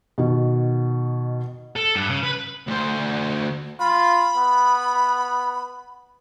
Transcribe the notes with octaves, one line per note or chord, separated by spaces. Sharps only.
B2 D#3
A4
G2
C#3
B4
D2 C5
F4 B5
B3